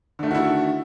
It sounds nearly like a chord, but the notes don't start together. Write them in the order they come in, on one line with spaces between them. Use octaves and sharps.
D3 A3 D#3 F#4 E4